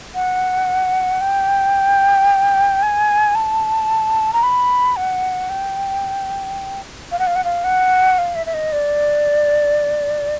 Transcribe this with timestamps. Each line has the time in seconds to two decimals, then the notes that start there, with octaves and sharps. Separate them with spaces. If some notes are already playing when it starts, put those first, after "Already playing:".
0.15 F#5
1.21 G5
2.83 G#5
3.35 A5
4.33 A#5
4.43 B5
4.97 F#5
5.50 G5
7.12 F5
7.19 F#5
7.27 F5
7.36 F#5
7.44 F5
7.64 F#5
8.19 F5
8.35 E5
8.46 E5
8.54 D#5
8.72 D5